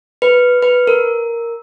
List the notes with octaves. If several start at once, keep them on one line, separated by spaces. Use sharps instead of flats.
B4
B4
A#4